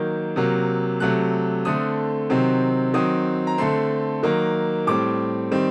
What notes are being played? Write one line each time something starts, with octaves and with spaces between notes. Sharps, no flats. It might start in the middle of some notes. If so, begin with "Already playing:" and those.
Already playing: D#3 F#3 A#3 G6
C3 F#3 A#3
C3 F#3 A3 F#6
D3 A3 C4 D#6
C3 D#3 F#3 C4
D#3 F#3 C4 D#6
A#5
D3 A3 C4 C6
D#3 F#3 A#3
A2 G3 C4 D6
D#3 G3 C4